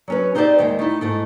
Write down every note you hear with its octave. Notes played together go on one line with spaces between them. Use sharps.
F#3 C#4 B4
C4 D#4 G4 G#4 C5 D5
D#2 G#3 G5
A3 D#4 E4
G#2 A3 E4